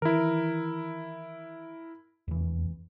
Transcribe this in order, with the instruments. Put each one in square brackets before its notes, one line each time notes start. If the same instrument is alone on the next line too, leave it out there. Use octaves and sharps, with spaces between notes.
[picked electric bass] D#3 E3 [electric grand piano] E4 A#4
[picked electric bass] F1 E3 [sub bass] E2